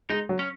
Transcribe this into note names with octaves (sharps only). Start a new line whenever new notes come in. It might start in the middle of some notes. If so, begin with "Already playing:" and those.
G#3 D#4
F#3
C#4